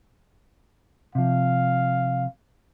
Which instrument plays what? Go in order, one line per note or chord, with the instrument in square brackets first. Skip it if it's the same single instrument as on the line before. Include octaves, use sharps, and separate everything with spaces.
[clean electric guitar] C3 F3 [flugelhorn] F5